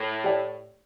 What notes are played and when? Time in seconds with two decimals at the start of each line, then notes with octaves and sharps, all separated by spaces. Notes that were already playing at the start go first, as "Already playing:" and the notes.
Already playing: A2
0.24 G4 D5 G5